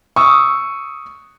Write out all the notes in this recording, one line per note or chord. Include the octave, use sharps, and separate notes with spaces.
C#6 D#6 E6